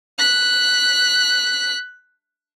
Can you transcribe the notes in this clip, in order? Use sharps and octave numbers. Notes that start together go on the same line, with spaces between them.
F#6 B6